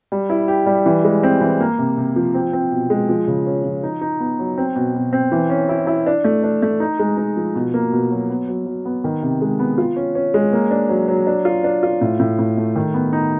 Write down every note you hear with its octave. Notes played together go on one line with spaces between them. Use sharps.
G3
E4
G4
G3
E3
G#3
C4
E3
A#3
C3
C3
F3
C4
C4
B2
G#3
F3
C#3
C#4
F3
D#4
D#4
B3
F#3
C4
B2
B2
C4
E3
C#4
E4
E4
D4
A3
D4
A3
D#4
G#3
D#4
F3
B2
A#3
B2
F#3
B3
F#3
F#3
B3
D#3
C3
G#3
B3
F4
C#4
C#4
G#3
A#3
D4
F#3
F#3
D4
F4
D4
F4
A2
A2
A2
A3
D#3
B3
D#4